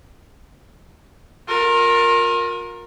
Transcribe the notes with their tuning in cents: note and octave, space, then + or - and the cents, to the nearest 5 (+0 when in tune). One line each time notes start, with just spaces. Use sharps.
F4 +40 A#4 +0